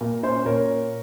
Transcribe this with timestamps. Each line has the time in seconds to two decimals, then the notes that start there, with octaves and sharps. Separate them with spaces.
0.01 A#2 A#4
0.23 C#4 C5
0.45 A#2 A#4 C#5